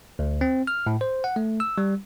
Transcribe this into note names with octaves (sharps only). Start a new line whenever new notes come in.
D2
C4
F6
A2
C5
F#5
A3
E6
G3